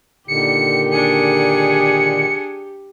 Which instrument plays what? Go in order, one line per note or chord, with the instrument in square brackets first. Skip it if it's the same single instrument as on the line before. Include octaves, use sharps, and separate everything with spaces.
[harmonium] A#2 D3 D#3 [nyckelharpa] G4 [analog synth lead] C#7
[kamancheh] D4 G#4 [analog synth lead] C#7